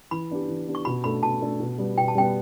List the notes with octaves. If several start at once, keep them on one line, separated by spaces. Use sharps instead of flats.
E3 B5
B3 D4 G4
E3
B3 D4 G4
C#6
B2 B5
A3 D4 A4 B5
B2 A5
A3 D4 A4
B2
G3 B3
B2 G5
A5
G3 B3 G5